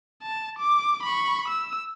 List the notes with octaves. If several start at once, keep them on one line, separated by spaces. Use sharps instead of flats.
A5
D6
B5 C#6
E6